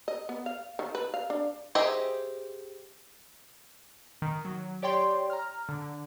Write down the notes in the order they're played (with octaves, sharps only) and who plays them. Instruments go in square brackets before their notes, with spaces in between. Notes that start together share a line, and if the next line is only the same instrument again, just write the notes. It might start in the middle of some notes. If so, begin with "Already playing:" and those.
[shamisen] D#5
B3
F5
D#3
B4
F5
D4
[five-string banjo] G4 G#4 C5 D#5 E5
[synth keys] D#3
F#3
G4 C#5 D5 G5 C6
A#5 F6
D3